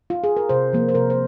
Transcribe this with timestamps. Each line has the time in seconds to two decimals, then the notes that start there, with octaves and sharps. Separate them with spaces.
0.10 F4
0.24 G#4
0.37 A#4
0.49 C3 C5
0.73 F3 A#3
0.89 C5
0.95 C3 A#4
1.10 C5